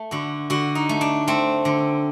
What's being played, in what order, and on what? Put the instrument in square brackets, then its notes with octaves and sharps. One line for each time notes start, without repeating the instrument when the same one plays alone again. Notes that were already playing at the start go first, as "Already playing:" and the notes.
Already playing: [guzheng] A3
D3 F#4
D3 F#4
D#4
A3
D4
A3 C4
D3